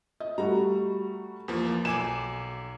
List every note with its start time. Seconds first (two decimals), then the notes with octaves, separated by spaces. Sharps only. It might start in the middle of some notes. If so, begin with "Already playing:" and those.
0.20 D#5
0.38 G3 A3 F#4 A#5
1.48 E2 F3 A#3
1.85 B1 G#5 D6 E7